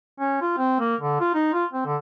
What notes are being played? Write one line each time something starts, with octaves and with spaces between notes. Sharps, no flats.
C#4
F4
C4
A#3
D3
F4
D#4
F4
C4
D3